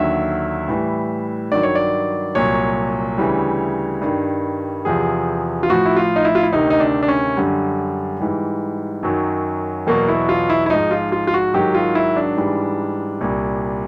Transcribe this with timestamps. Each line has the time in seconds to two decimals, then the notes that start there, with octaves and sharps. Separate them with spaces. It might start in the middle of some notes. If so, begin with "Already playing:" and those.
Already playing: D#2 D3 F#3 E5
0.69 A2 E3 G3
1.51 G2 D#3 F#3 D5
1.63 C#5
1.75 D5
2.35 C2 A#2 F#3 C#5
3.18 D2 C#3 E3 G3
4.02 G2 D#3 G3
4.85 E2 C3 F3 G#4
5.63 F4
5.70 A2 F3 F#4
5.86 E4
5.97 F4
6.16 D#4
6.25 E4
6.35 F4
6.43 E4
6.53 D2 C3 D#3 D#4
6.70 D#4
6.80 D4
7.03 D4
7.08 C#4
7.37 F#2 D3 G3
8.20 G#2 E3 G3
9.03 F#2 D#3 F#3
9.87 E2 B2 F#3 A#3
10.08 E4
10.29 F4
10.50 E4
10.66 E4
10.70 G#2 F3 D#4
10.91 F4
11.12 F4
11.27 F4
11.34 F#4
11.54 G#2 D#3 F#3 G4
11.74 F4
11.95 E4
12.16 D4
12.37 G#2 E3 G3
13.21 C2 A#2 G3